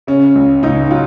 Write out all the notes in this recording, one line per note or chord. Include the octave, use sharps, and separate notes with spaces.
C#3 C#4
C#2
C#2 D#4
F#3 F4